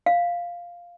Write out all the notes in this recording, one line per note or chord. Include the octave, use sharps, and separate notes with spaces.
F5